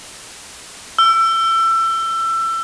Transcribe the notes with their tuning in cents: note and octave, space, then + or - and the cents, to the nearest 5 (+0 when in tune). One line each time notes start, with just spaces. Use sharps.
E6 +25